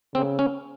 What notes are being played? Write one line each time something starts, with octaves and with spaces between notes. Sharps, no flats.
C#3 C4
C#4